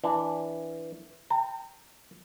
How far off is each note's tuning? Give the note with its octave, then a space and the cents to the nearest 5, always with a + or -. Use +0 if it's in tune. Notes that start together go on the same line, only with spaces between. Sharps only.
E3 +0 D4 +0
G5 +0 A#5 -45